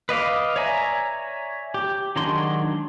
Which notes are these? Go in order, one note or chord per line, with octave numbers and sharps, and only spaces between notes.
B4 D#5 F5 D6
C#5 D5 E5 G#5 A#5
G4
D#3 F#3 G#3 D4 C6